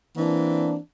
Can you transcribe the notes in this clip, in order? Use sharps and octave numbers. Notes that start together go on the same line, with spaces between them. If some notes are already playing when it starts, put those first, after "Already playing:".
E3 A#3 C4 D4